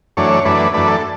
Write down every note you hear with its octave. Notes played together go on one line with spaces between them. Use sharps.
F#2 E3 A3 D4 C#5
F#2 E3 A3 D4 B4
F#2 E3 A3 D4 B4
A4